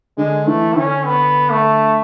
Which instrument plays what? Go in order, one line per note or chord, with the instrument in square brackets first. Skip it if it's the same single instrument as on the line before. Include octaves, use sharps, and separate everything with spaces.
[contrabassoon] D3 [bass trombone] G#3
[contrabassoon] E3 [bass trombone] A3
[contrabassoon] D3 [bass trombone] C#4
[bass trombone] B3
A3